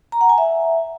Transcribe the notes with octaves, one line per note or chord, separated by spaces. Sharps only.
A#5
F#5
G#5
E5